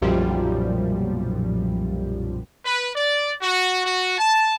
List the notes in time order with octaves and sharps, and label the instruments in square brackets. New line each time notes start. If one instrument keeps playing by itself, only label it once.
[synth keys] B1 F#2 A#2 F3 G3
[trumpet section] B4
D5
F#4
F#4
A5